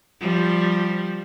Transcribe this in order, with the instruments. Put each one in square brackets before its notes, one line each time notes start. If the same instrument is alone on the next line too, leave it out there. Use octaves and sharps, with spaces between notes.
[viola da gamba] F3 G3